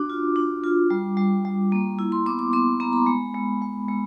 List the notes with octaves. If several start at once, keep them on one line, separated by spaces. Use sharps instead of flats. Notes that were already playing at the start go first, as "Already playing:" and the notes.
Already playing: D4 F#4 D6
F4
D4
F4
G3
G3
G3
A#3
E4
C6
B3 D6
D6
B3 C6
B3 A#5
B5
G#3
G#3
G#3
G#3